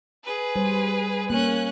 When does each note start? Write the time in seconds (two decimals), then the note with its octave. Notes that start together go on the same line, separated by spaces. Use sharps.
0.24 G#4 B4
0.56 G3 C5
1.30 A#3 C#4 F#6